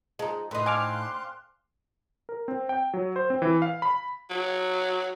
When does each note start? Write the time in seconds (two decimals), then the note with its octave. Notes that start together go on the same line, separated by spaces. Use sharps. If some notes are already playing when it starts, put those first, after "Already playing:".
0.19 F3 G#3 D#4
0.51 A2 E3 D#4 C6 F#6
0.66 D3 C4 F5 G#5 D6 F6
2.29 A#4
2.48 C4
2.69 G5
2.94 F#3
3.16 C5
3.30 C4
3.42 E3
3.62 F5
3.82 B5
4.30 F#3